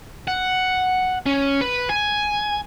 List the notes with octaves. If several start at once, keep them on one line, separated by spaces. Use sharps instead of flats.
F#5
C#4
B4
G#5